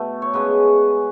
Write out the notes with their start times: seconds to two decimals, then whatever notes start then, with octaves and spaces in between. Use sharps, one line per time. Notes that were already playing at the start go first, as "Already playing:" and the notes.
Already playing: B2 A3
0.22 C#5
0.34 C#3 G#3 B3 B4